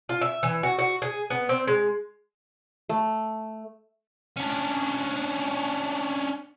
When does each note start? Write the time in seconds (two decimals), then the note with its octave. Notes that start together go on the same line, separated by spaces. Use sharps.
0.09 F4
0.21 E5
0.43 E3
0.63 F#4
0.78 F#4
1.02 G#4
1.30 B3
1.49 C4
1.67 G#3
2.89 A3
4.37 C#4 D4